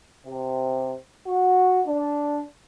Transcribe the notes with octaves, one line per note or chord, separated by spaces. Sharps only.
C3
F#4
D4